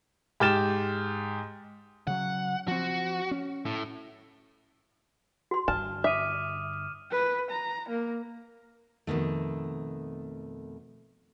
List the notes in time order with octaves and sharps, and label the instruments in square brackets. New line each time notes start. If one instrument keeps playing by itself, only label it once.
[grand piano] G#2 G4 F6 A6 E7
[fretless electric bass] C#3 F#3 [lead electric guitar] F#5
[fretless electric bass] F3 C4 [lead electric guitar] F#4
[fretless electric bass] C#4
[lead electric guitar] A2
[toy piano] F#4 C6
[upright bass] G2 D3 [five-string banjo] A5 [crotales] F6
[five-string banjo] E5 [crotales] D6 D#6 D#7
[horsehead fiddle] B4
A#5
A#3
[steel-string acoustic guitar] F2 B2 D#3 A3